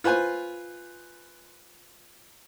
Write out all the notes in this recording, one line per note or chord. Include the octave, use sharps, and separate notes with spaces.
F4 B4 C5 G#5